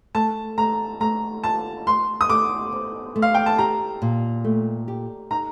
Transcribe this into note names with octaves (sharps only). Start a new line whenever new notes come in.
A3 A5
A3 A#5
A3 A#5
F4 A5
A3 C6
D#6
A3 D6
C4
A3
F5
G5
A5
G4 A#5
A#2
A3
G4
D#4 A#5